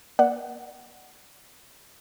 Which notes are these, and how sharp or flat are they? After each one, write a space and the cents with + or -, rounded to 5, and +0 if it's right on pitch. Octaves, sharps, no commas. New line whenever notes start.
A#3 +35 D5 +0 F#5 +0